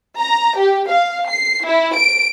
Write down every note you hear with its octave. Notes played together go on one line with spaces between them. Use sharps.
A#5
G4
F5
C7
E4
D7